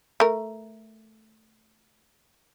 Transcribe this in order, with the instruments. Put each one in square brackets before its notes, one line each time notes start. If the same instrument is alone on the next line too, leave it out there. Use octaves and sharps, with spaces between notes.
[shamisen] A3 A#4